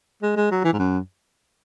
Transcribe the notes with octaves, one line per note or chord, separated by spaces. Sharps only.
G#3
G#3
F#3
E3
G#2
F#2